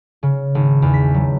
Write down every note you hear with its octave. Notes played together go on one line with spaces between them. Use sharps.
C#3
G#1
E2
B6
F#3